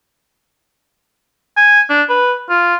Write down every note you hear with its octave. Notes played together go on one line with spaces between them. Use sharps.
G#5
D4
B4
F4